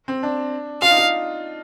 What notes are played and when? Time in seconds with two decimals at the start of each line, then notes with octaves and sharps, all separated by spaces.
0.08 C4
0.23 D4
0.82 F4 F5
0.91 D#4
0.98 F4